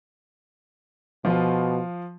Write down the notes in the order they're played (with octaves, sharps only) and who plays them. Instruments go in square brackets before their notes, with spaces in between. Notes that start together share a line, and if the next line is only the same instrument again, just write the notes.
[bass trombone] B2 [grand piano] F3 F4